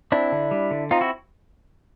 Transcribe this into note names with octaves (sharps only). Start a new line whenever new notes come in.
C4 D4 E4
D3
G3
D3
C4 D#4 F4
E4 F#4